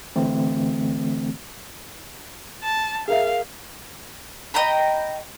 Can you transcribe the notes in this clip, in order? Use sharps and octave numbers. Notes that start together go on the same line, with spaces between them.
D3 E3 A3 C4
A5
G#4 A#4 E5 F5
D#5 G5 A#5 B5